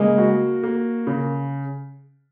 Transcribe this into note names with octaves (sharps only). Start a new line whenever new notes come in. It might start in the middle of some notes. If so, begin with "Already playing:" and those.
Already playing: C#3 G#3 A#3
F#4
A#3
C#3